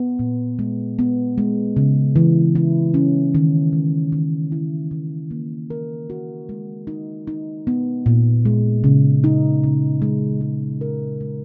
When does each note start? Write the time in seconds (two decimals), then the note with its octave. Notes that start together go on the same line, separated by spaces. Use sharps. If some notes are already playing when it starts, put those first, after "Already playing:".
Already playing: B3
0.19 A#2
0.59 G#3
0.99 B3
1.38 G#3
1.76 C#3
2.16 E3
2.55 E4
2.94 C#4
3.35 D#3
3.73 G#3
4.12 D#3
4.52 E4
4.91 D#3
5.31 A#3
5.70 A#4
6.10 F#4
6.49 G#3
6.87 D#4
7.27 D#4
7.67 B3
8.06 A#2
8.45 G#3
8.84 C#3
9.24 D#4
9.64 C#3
10.02 G#3
10.41 G#3
10.81 A#4
11.21 G#3